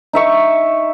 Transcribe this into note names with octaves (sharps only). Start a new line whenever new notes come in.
D#4 E5 C#6